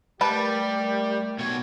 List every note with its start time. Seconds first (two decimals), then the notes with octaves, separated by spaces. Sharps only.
0.21 G3 A3 G4 A#4 B4 A5
1.39 B2 C#5